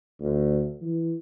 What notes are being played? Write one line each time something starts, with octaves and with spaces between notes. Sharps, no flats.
D2
E3